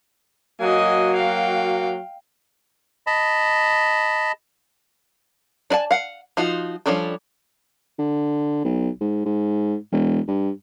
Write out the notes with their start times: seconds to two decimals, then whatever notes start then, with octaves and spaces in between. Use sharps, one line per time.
0.61 F#3 A#3 F#4 D#5 G#5
1.15 F5 G5
3.07 D#5 A5 B5
5.70 D4 D5 G#5 A5
5.91 F5 F#5
6.37 F3 D#4 F4 F#4
6.86 F3 G3 C#4 D4 A4
7.99 D3
8.64 B1
9.01 G#2
9.25 G#2
9.92 E1
10.28 G2